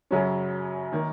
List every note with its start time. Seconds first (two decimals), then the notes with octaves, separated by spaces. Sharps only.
0.11 F#2 C#3 F#3 C#4
0.92 D#3 A#3